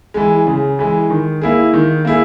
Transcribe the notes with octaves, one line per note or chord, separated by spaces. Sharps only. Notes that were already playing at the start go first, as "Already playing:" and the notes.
E3 G#3
C#3
E3 G#3
D#3
A#3 E4 G#4
D#3
A#3 E4 G#4